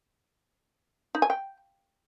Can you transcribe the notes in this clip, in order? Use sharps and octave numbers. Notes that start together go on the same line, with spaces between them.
D#4
G#5
G5